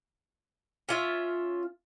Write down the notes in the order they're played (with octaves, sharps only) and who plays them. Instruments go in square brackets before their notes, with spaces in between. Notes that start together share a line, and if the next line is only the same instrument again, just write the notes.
[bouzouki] C#4 F4 E5